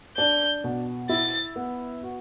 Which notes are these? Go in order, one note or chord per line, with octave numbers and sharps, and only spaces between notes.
D4 G6
B2
E4 A6
B3
F#4